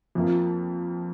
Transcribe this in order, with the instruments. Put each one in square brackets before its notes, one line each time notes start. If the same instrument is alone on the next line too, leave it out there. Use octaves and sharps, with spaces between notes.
[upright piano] F2 F3 A#3